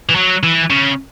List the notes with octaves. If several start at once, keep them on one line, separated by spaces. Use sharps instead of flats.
E3
F#3
E3
C#3